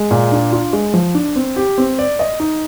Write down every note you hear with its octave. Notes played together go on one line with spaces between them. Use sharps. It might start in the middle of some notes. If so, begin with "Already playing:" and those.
Already playing: G#3
A#2
D4
F4
G#3
F3
D4
C4
G4
C4
D5
D#5
D#4